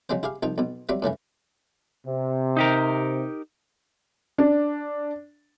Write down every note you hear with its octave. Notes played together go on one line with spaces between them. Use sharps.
C#3 F#3 G#3 C4 C5
E4 G4 G#4 F5
C2 F3 D#4 G5
B1 B2
F#3 G3 C4 D5 E5
F#2 A2 C#3 E3
C3
D#4 G4 A#4
D4